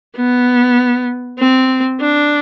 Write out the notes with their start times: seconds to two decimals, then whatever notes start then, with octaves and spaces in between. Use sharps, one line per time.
0.16 B3
1.39 C4
2.01 D4